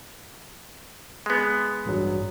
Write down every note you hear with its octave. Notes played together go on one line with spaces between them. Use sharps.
G#3 B3
A1 G2 F#3